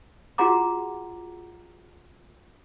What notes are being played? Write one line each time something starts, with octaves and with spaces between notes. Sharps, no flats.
F4 F#4 G#4 F#5 A#5 D6